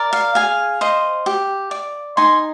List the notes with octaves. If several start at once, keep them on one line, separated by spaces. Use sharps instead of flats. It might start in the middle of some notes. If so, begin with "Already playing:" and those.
Already playing: A#4 D5
F5
G#4 F5 G#5
C5 D#5
G4
D5
D#4 G#5 C6